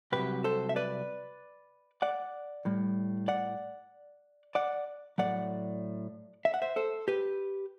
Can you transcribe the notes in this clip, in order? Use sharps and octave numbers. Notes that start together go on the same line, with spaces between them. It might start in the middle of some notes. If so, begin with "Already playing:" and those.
C2 C3 F#3 G4 B4
A4 C5
E5
B4 D5
D5 F#5
A2 G3
D5 F#5
D5 F#5
A2 F#3 D5 F#5
E5
F#5
C5 E5
A4 C5
G4 B4